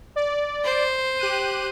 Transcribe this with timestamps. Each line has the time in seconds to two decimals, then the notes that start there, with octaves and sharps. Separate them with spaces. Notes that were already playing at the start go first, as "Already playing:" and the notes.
0.16 D5
0.64 C5
1.19 G4 F#6 D#7